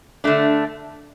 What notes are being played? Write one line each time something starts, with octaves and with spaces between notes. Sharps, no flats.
D3 A3 D4